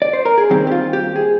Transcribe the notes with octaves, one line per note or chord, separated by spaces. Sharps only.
D5
C5
A#4
G#4
D#2 D#3 G3 C4 G4
G4
F4
G4
G#4